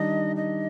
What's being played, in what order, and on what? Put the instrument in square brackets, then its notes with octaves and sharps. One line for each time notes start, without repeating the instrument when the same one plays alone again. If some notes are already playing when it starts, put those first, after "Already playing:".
Already playing: [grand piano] D#3 G3 D4 [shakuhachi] D#5
[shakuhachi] D#5